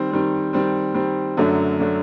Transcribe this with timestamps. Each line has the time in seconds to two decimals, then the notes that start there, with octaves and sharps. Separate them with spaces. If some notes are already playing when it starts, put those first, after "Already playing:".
Already playing: D#3 G3 C4
0.11 D#3 G3 C4
0.53 D#3 G3 C4
0.94 D#3 G3 C4
1.37 F#2 D3 F#3 A3 D4
1.80 D3 F#3 A3 D4